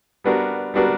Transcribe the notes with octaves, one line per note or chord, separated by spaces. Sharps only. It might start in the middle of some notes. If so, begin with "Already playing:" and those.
G3 B3 D4 F#4 A#4
G3 B3 D4 F#4 A#4